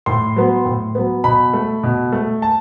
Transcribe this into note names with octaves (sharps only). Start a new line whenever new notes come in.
A2 C6
F#3 B3
A2
F#3 B3
B2 B5
A3
B2
A3
A5